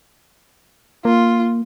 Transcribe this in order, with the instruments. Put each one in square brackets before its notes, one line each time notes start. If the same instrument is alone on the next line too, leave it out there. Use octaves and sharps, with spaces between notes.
[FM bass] A#3 [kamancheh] F4